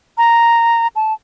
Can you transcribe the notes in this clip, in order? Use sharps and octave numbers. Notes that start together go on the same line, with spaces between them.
A#5
A5